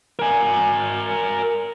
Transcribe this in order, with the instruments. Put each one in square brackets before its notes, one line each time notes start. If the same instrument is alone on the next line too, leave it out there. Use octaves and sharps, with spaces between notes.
[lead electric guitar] A#4 G#5